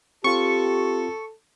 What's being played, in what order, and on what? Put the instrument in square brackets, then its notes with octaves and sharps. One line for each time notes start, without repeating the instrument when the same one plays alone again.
[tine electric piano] C4 F4 [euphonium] G4 [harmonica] A4 [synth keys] C#6